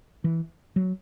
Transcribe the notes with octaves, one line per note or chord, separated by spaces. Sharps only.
E3
F#3